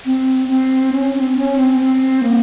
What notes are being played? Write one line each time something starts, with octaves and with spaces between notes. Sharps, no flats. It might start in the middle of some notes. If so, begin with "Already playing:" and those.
C4
C4
C#4
C#4
C4
C#4
C4
C4
A#3